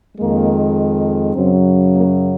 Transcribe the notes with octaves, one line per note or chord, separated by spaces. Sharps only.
F2 D#3 G#3 A#3
F#2 C#3 F#3 C4
A#3